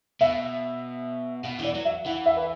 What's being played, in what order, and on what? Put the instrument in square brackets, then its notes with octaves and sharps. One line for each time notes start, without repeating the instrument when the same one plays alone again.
[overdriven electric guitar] B2 [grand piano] E5
[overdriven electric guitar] B2 [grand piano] F#5
[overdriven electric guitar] E3
[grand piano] D5
[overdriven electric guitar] F#3
[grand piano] E5
[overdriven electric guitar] E3 [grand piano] F#5
[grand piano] E5
B4